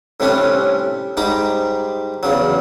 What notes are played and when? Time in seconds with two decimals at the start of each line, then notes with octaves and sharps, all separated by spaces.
0.20 A2 C3 G3 A3 C#4 D4
1.17 G#2 G3 D#4 A#5 D6
2.23 E2 C#3 F#3